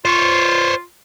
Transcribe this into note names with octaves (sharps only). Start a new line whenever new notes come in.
F4 C5 C#5